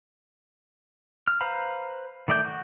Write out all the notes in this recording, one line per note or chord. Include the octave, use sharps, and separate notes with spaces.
F6
B4 C5 F5 A#5 B5
D#3 A3 D5 D#5 G6
F#4